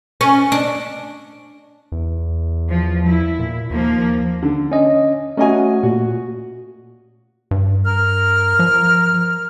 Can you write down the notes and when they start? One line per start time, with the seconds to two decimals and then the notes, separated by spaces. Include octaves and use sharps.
0.21 C#4
0.52 D4
1.92 E2
2.71 F3
3.10 E4
3.39 A#2
3.71 D#2 F3 A#3
4.43 D3
4.72 C#4 D#5
5.37 A3 C#4 F#4 D#5 G#5
5.83 A#2 F#4
7.51 G2
7.84 A#4 F6
8.59 F3